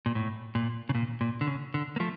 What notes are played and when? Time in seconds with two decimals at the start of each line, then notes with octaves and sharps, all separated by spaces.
0.06 A#2
0.15 A2
0.55 A#2
0.89 C#3
0.95 A#2
1.21 A#2
1.41 D3
1.47 C#3
1.74 D3
1.96 A#3
2.00 F3 A3